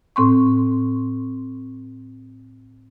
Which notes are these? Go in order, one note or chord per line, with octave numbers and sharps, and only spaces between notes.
A2 C4 C6 C#6